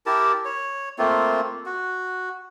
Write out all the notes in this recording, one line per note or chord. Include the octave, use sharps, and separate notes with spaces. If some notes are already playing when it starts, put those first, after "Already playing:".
E4 G4 A#4 A5
C#5
A3 A#3 C4 F4
F#4